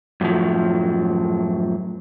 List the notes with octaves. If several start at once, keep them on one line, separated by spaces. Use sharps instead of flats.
F#2 A2 D3 F3 F#3